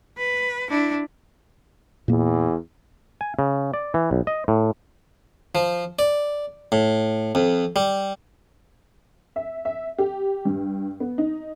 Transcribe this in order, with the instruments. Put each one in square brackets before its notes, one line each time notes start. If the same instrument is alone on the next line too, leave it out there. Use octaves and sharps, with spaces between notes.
[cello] B4
D4 E4
[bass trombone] E2 [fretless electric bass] A#2 A#3
[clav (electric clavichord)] G#5
C#3
D5
E3
B1
D#5
A2
[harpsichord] F3
D5
A2
F2
G3
[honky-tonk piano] E5
E5
G4
G2
B3
D#4